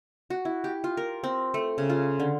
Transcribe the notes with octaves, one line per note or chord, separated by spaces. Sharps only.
F#4
E4
G4
F4
A#4
C4
A3
C#3
F4
D3